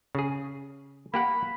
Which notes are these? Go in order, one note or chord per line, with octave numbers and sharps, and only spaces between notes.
C#3 G#4
A#3 G4 F#5 B5